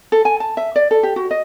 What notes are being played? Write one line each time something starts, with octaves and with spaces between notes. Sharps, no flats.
A4
G#5
A5
E5
D5
A4
G4
F#4
D#5